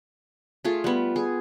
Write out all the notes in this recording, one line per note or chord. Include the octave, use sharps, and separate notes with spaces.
A3 F4 G#4
G3 B3
G#4